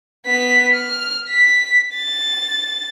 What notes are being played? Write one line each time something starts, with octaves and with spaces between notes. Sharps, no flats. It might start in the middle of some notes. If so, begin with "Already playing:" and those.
B3 B6
F6
B6
A6